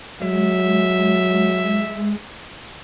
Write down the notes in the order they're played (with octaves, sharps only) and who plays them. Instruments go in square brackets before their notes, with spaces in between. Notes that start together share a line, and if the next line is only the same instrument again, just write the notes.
[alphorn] F#3 [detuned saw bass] G#3 [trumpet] E5